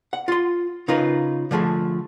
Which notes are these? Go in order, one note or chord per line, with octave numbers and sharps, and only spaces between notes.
F#5
F4 C6
C#3 D#4 F4 A#4 B4
D3 F3 A3 G#4